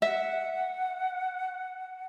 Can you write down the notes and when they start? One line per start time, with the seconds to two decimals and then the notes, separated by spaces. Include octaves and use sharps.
0.02 E5 F#5